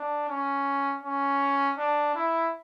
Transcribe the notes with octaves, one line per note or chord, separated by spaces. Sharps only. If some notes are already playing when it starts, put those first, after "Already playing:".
Already playing: D4
C#4
C#4
D4
E4